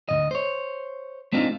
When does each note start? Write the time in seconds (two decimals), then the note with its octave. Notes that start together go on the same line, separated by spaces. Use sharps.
0.09 D2 C#3 D#5
0.31 C5 C#5
1.33 A3 C4 D4 D#4 F4